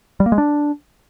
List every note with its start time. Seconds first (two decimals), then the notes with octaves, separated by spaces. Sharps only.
0.20 G3
0.26 A#3
0.32 G#3
0.38 D4